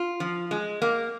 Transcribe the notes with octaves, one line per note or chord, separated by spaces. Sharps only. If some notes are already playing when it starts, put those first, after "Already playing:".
Already playing: F4
F3
G#3
A#3